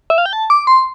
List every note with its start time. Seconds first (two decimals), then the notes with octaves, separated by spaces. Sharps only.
0.10 E5
0.18 F5
0.26 G5
0.33 A5
0.50 D6
0.67 C6